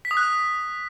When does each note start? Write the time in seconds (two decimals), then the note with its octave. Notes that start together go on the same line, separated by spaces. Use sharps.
0.05 B6
0.11 D#6
0.17 F#6
0.23 D#6